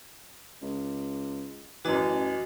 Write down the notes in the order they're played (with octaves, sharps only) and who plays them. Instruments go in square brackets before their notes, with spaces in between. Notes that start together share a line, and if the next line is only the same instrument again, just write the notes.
[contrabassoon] C#2
[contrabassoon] A1 [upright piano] F#2 E3 [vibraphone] F#4 D#5